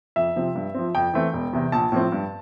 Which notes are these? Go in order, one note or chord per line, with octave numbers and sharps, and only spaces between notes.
F2 E5
C3 F3 C4
G2
F3 C4
F2 G5
E3 A3 C4
E1
E2 C3
A#1 A5
A2 F3 C4
G2